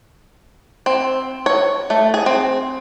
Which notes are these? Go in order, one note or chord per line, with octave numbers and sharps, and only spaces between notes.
C4
C#5
A3
G#4
C4